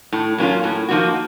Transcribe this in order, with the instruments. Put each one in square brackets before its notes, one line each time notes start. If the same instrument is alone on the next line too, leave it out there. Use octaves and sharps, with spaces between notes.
[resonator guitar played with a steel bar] A2
F#3 A#3 C#4 F4
A2
F3 A#3 D#4 F#4